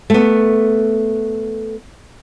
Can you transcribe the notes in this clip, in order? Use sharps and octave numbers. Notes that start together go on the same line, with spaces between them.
A3 B3